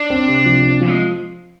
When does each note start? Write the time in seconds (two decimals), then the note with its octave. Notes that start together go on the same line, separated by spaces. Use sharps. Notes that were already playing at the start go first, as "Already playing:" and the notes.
Already playing: D4
0.10 C4
0.28 C3
0.46 F3
0.63 C4
0.81 F3
0.90 G#3